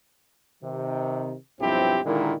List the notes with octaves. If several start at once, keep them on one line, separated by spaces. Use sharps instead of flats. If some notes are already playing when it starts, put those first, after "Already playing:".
C3 D#3
B1 G2 F3 C4 E4 G4
A#2 D3 D#3 G#3 A#3 E4